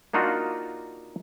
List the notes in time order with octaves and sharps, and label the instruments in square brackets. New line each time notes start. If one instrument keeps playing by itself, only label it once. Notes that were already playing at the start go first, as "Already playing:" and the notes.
[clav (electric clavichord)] A#3 D4 D#4 F4 F#4